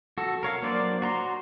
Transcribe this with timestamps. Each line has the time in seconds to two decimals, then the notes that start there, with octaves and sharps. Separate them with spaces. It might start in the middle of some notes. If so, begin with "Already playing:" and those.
0.18 F#4 A4
0.43 A#4 C#5 F5
0.63 F#3 A#3 D4 C5 D5
1.02 F#4 A#5 C6